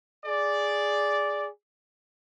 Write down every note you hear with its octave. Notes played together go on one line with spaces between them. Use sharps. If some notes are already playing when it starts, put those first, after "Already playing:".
G#4 D5